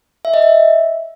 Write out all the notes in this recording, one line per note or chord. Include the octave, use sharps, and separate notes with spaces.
E5
D#5
E5